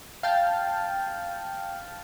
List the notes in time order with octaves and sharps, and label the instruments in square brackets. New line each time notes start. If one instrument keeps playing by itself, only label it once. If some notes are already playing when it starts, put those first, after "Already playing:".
[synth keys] F5 G5 A5